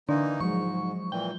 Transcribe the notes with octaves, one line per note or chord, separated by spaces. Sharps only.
D3 E3 A#3 D4 D#4
G#2 F3 F#3 G#3 C#6
A#2 E3 G5